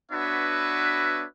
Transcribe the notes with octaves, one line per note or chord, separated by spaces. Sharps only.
B3 D4 F#4 B4 C#5 E5